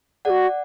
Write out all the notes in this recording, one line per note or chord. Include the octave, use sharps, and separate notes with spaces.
G#4 D5 F#5
F#4